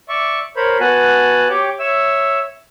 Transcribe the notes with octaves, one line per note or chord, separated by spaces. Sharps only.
D5 E5 C#6
A#4 C5 C#5 B5
B3 F#4 G#5 A5 F#6
G4 C#5 G5 D6
C#5 E5 E6